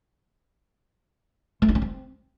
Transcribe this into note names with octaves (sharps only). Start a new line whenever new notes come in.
A3
D4
C#4
C4